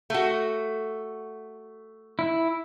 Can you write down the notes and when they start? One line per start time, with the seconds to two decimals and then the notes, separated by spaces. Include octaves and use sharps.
0.10 A3 F#4
2.19 E4